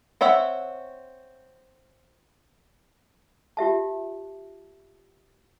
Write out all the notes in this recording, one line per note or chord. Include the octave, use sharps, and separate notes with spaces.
C4 C#5 E5 F#5
F4 G4 E5 A5